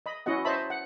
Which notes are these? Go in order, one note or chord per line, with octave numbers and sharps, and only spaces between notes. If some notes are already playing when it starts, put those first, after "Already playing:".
D#5 B5
C#4 E4 F#4 D#5 F#5
C5 C#5 D#5 E5 A5 B5
F#5